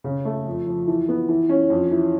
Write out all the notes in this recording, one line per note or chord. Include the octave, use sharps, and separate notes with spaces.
C#3
A3
F2
F3
E3
B3
E3
C#4
F2
E3